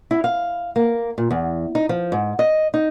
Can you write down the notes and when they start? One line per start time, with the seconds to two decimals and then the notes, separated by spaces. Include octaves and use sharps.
0.11 E4
0.24 F5
0.76 A#3
1.18 A#2
1.31 E2
1.75 D#4
1.89 F3
2.12 G#2
2.39 D#5
2.74 D#4